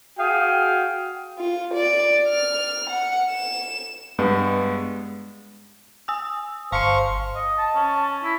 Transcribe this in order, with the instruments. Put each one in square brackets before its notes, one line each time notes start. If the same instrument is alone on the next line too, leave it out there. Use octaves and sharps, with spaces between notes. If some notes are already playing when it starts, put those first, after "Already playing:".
[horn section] F#4 G#4 F5 G5
[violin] F4
D5
F6
F#5
E7
[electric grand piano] G2 G#3 B3
[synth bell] G#5 D#6 E6
[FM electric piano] G1 [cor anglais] C5 [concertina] F5 C#6 [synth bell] A5 C#7
[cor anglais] D#5
[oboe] A5
[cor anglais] C#4
[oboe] E4